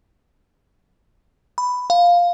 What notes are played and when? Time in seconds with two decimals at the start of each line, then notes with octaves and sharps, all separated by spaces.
1.58 B5
1.90 F5